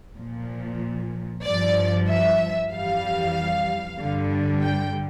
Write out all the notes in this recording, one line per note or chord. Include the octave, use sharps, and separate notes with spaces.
A#2 F3
G2 F3 D5
E5
F2 E3 G3 F5
G2 D3 G3
G5